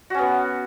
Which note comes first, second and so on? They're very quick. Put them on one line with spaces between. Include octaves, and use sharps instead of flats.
F#4 C#4 B3